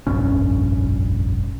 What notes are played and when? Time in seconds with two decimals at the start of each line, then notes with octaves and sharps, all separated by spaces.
0.07 F1 A#1 G2 C#4